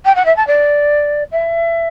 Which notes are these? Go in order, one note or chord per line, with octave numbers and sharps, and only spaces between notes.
G5
F#5
E5
A5
D5
E5